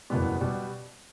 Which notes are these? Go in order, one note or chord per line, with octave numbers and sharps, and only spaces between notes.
F#1 E2 B2 G3 B3
B2 G3 B3